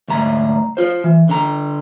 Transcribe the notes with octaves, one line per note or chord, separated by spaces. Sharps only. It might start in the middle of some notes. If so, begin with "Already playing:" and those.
D2 G#2 A#5
F4 C5
E3
D3 A#5